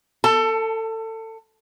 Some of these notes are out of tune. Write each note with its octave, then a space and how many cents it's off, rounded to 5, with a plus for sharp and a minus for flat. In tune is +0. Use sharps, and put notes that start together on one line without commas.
A4 +25 A5 +0